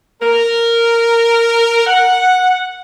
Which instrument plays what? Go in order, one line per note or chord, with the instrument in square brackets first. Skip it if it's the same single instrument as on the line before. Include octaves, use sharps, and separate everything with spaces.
[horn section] A#4
F#5